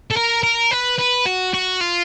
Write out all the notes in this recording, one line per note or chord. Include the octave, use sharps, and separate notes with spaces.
A4
A#4
A#4
B4
B4
F#4
F#4
F4